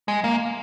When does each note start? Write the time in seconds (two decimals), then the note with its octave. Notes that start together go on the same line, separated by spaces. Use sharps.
0.08 G#3
0.24 A#3